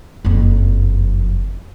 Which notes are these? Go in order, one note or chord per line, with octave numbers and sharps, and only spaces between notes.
F#1 F2